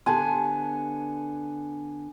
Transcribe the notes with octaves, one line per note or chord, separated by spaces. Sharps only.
D3 B3 G4 G#5 A5 C6